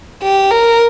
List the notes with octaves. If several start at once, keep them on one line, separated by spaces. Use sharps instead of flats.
G4
A#4